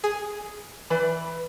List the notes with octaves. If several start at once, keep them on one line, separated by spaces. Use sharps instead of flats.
G#4
E3 B4 D5 B5